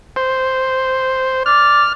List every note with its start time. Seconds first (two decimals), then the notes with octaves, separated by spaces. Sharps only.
0.16 C5
1.46 D5 F6